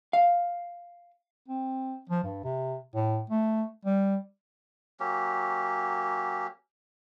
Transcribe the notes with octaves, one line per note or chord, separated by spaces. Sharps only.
F5
C4
F3
G2
C3
A2
A3
G3
F#3 A#3 C#4 G4